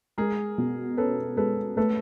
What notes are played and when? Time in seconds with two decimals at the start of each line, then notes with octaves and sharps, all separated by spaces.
0.18 G#3 G#4 A#4
0.58 B2
0.97 C#4 A4 B4
1.37 G#3 A4 B4
1.77 A3 A4 B4